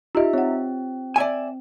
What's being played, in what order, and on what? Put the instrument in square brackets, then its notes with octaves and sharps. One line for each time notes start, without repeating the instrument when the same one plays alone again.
[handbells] D#4 E5 [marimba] F4 G4 D#5
[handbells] C4 [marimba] C#5 F#5
[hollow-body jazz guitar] D5 E5 G#5